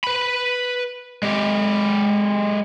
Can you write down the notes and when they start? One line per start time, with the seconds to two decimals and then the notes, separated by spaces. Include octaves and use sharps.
0.04 B4 B5
1.23 G#3 G4